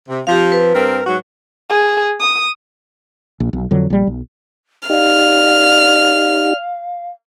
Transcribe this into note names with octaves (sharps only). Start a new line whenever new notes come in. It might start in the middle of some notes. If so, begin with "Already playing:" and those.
C3
F3 C4 G4 F5
B4
G2 C4 A#4
G#2 F#3 F#4
G#4
D#6
A#1
B1
F2 D3 F#3
A#1 G3
B1
D#4 G4 D5 F5 F6